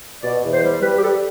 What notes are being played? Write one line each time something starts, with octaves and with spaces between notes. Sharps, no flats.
B2 D5
E2
C5
G3
G3 B4
G4
G3 A4